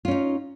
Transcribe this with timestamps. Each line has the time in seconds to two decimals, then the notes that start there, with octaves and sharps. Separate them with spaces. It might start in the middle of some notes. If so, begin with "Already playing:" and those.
0.05 F4
0.08 C#4
0.11 D#4